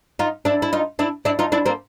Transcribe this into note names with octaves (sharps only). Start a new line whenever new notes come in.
D#4 F4
D4 E4
E4
D#4 F4
D4 E4
D4 E4
D#4 F4
D4 E4
A#3 C4